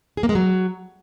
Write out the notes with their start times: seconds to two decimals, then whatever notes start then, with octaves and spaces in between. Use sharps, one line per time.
0.17 G#4
0.23 A#3
0.29 G#3
0.35 F#3